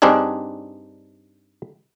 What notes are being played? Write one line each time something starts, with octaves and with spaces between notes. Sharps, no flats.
G2 G3 C4 D4 D#4 G#4